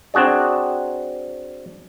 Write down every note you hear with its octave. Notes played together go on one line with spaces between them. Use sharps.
C4 D4 F#4 G#4 D5